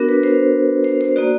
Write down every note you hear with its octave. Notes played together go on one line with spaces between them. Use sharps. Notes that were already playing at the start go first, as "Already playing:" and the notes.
Already playing: B3 D4 F#4 A#4
B4
C5
C5
C5
A#3 D#4 F#4 D5